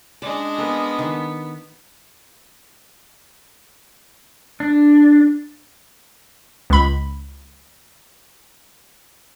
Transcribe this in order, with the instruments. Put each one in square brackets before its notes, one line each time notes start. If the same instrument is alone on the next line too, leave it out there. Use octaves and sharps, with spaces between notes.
[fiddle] G#3 D4 [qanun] C#4 D5
[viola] B3 [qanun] A#4
[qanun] D#3
[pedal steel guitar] D4
[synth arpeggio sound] C#2 B5